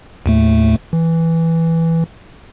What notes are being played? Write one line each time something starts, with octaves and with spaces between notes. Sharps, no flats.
D#2 A2 A3
E3